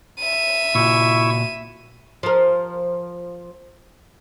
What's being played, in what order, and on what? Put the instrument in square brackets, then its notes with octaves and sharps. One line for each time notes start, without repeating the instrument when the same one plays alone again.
[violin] E5 D#7
[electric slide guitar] A#2 F#4 [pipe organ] E4 C#6 E6
[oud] F3 A#4